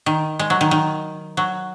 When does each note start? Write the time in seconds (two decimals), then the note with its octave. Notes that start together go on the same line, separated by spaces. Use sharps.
0.06 D#3
0.39 G#3
0.50 F#3
0.61 D#3
0.71 D#3
1.37 F#3